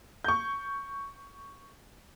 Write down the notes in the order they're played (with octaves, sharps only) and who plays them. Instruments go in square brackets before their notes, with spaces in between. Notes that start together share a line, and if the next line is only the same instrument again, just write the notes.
[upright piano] C#6 G6